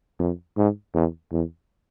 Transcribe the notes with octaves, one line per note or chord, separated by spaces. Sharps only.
F2
G#2
E2
E2